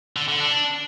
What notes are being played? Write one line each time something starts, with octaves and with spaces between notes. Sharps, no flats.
D3
D3
D4